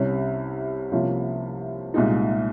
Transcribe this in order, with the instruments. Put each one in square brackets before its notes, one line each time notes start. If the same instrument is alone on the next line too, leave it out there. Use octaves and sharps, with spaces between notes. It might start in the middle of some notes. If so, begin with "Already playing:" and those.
Already playing: [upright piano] C2 C3 G3 C#4
C2 C3 F3 A#3 C#4
C2 A#2 G#3 D#4